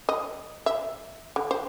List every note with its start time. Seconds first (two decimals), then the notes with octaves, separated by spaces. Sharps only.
0.09 D#5
0.66 E5
1.36 D3
1.51 C5